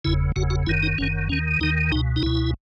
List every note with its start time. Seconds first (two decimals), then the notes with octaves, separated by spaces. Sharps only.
0.05 F#1 E2 C#3 E4
0.36 F#1 E2 C#3 F#4
0.50 F#4
0.67 F#1 F#2 D#3 E4
0.83 D#4
0.98 F#1 F#2 D#3 C#4
1.29 D#2 D#3 C#4
1.60 D#2 D#3 D#4
1.92 C#2 B2 D#4
2.16 D#4
2.23 C#2 B2 E4